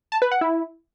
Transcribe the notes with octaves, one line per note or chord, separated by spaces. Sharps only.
A5
B4
F#5
E4